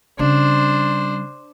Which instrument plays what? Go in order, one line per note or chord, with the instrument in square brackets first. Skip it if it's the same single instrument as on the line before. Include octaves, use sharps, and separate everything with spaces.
[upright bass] C#3 G3 [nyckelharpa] D4 C5